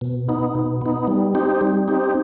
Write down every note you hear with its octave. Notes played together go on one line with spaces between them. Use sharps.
B2
B3 D#4
B2
B3 D#4
G3
C4 D#4 G4
G3
C4 D#4 G4